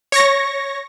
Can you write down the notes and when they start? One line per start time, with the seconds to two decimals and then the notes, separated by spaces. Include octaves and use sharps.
0.12 C#5 C#6 A#6